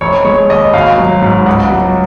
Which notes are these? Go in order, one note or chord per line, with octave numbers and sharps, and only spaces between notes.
F1 C#5
G#3 C#5
D#2 D#5
G#1 F5
F#3
G#2
C#2 F#5
F#3